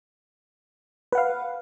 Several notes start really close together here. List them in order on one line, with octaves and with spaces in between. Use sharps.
B4 F#5 F5